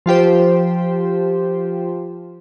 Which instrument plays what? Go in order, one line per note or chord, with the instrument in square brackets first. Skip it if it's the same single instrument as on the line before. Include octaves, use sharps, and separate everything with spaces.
[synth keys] F3 F4 G4 C5